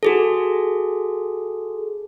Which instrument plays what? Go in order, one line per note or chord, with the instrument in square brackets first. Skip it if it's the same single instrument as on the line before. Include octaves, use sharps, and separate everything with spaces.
[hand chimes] F#4 G#4 A4